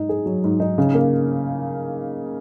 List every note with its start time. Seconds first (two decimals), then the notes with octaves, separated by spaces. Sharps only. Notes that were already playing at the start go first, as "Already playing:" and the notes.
Already playing: G#2 D#4
0.09 G#4
0.26 F#3
0.44 G#2
0.60 D#4
0.78 C#3
0.94 A#3